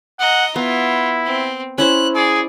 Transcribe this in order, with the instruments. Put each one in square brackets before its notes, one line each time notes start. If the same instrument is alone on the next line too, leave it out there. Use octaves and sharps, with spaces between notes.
[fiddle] D#5 A#5 [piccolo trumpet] F#5
[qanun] B3 [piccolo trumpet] E4 [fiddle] F4
[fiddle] C4
[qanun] C#4 E4 C5 [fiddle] F#6
[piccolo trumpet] G#4 [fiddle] D5